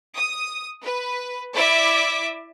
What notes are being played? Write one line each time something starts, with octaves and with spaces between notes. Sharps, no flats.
D#6
B4
E4 D5 E5 D6